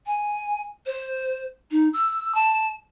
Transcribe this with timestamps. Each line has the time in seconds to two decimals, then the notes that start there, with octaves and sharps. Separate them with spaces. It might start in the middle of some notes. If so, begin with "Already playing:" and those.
0.06 G#5
0.86 C5
1.71 D#4
1.93 E6
2.35 A5